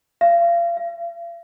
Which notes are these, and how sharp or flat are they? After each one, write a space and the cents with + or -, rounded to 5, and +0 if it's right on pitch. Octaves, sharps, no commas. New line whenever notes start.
F5 -35
F5 -45